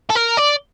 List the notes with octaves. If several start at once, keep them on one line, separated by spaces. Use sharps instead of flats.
A4
A#4
D5